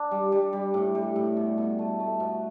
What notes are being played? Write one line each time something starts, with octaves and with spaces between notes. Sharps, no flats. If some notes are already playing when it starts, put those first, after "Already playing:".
Already playing: D4
G3
G3
G3
A2
G3
A2
B2
B2
A3
A3
B2